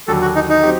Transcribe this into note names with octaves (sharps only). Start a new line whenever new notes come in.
D#2 D3 F#3 A4
F#4
D#4
D#4
F#3 C4 G4